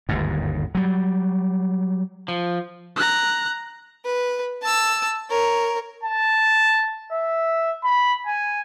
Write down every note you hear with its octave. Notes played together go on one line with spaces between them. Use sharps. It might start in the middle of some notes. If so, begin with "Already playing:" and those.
G1 D#2 G#2
F#3 G3
F3
A#5 F#6
B4
A5 E6
A#4 C#5
A5
E5
B5
G#5